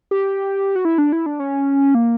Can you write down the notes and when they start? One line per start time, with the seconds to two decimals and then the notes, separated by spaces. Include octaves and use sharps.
0.11 G4
0.76 F#4
0.85 E4
0.98 D4
1.12 E4
1.26 D4
1.40 C#4
1.95 A#3